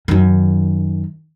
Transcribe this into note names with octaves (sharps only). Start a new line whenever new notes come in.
F#2 D#3